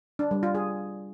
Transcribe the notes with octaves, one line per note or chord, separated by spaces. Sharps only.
D4
G3
F4
G#4